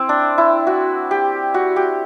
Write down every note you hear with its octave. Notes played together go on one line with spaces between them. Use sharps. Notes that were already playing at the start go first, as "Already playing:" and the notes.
Already playing: C4 E4
D4
E4
F#4
G4
F#4
G4